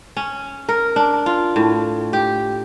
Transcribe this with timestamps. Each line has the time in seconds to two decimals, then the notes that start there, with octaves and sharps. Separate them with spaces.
0.17 C#4
0.69 A#4
0.96 D4
1.26 F4
1.56 A2
2.13 G4